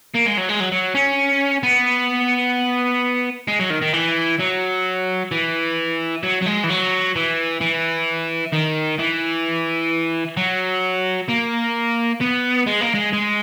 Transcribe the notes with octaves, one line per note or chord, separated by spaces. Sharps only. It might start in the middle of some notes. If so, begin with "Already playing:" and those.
A#3
G#3
F#3
G#3
F#3
F#3
C#4
B3
G#3
F#3
D#3
D#3
E3
F#3
E3
F#3
F#3
G#3
E3
F#3
E3
E3
D#3
E3
F#3
A#3
B3
G#3
A#3
G#3
G#3